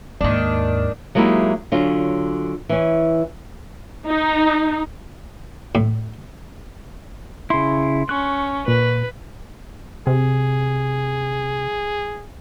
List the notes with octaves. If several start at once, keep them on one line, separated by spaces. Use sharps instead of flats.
D#2 G#2 D#3 D4
F#3 G#3 A#3 D#4 E4 G4
D3 F#3 C#4 F4
E3 C#4
D#4
A2
C#3 E4 C6
C#4 C#6 F#6
A#2 B4
C3 G#4